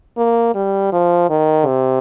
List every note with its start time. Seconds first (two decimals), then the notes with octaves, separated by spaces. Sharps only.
0.17 A#3
0.55 G3
0.92 F3
1.30 D#3
1.67 C3